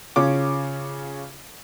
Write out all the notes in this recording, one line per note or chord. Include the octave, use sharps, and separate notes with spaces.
C#3 C#4 F4 D6